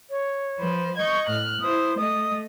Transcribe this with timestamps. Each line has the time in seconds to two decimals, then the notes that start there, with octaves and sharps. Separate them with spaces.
0.10 C#5
0.59 F3 B4 C5
0.97 D#5 C#6 G6 G#6
1.27 A2 F6 F#6
1.61 E4 C5 D#6
1.97 A3 D#5 D#6